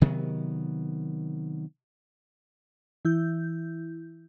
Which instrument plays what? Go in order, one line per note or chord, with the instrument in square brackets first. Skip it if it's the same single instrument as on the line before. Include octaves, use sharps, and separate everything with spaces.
[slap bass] C3 D#3 F#3 B3
[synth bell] E3 E4 G6